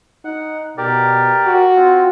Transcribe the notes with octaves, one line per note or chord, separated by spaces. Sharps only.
D#4 F#5
B2 G4 A#4 D5
F#4
C4 F4